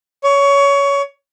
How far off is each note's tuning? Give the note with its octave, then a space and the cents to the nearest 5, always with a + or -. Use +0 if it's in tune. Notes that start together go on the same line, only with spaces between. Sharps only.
C#5 +20